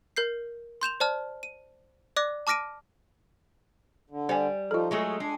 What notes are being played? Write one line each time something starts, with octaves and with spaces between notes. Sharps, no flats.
A#4 G6 C7
C6 G6 E7 F7
C5 D5 A5 F6
D#7
D5 D6 F#6 A#6
A5 D6 F6 A#6 D7 D#7
D3
G3 C5 G#5
F3 D#4 F4 A4
F#3 G#3 A3 G#4
G#3 D4 G#5